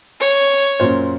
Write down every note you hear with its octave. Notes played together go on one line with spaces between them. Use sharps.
C#5
F#2 A#2 C5